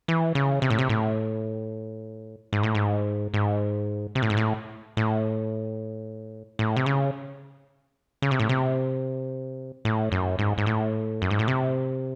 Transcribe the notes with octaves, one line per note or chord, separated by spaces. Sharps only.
E3
C#3
C3
A2
C3
A2
G#2
A2
G#2
G#2
C3
A2
G#2
A2
A2
A2
C3
C#3
C#3
C3
A2
C3
A2
F#2
G#2
G#2
A2
F#2
G#2
A2
C3